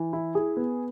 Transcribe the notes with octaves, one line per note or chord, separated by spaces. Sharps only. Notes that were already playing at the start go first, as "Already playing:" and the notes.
Already playing: E3
E4
G#4
B3